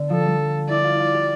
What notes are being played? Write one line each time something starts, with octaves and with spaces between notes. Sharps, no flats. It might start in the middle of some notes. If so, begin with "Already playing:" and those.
Already playing: D3 B3
F3 A4
G3
E4 D5
F4
F4
G4